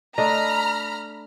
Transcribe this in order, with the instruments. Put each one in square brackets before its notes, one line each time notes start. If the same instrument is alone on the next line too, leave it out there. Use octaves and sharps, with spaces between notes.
[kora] A3 D4 D#5 [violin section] A#5 B5 F6